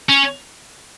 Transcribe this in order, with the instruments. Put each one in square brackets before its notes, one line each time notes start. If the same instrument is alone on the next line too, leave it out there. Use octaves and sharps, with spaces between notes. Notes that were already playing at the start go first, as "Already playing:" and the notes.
[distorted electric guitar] C#4